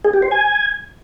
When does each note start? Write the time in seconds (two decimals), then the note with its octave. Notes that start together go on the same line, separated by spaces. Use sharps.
0.05 G#4
0.13 G4
0.22 C5
0.31 G#5